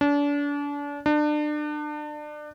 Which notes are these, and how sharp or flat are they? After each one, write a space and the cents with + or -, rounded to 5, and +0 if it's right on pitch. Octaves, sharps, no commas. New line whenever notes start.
D4 -35
D4 +30